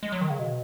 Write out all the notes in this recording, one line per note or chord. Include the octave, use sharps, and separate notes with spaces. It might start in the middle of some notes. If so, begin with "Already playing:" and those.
G#3
F#3
D#3
C#3
B2